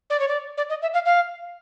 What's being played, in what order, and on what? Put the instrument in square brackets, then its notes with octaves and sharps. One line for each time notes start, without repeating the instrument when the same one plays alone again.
[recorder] D5
C#5
D5
D5
D#5
E5
F5
F5